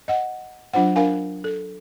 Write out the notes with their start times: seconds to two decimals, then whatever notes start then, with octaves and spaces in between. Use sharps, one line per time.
0.08 D#5 F#5
0.73 F#3 D4 F4 C5 F#5
0.96 D4 A#4 F5 G#5
1.44 A4